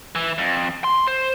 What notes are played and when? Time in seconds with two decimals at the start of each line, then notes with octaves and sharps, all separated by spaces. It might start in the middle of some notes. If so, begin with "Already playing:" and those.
0.15 E3
0.38 F2
0.84 C6
1.07 C5